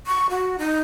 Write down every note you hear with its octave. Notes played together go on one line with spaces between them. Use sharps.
C#6
F#4
D#4